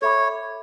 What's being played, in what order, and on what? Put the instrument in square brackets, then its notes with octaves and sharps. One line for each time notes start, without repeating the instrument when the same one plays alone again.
[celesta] A4 E5 B5 D6 [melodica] C#5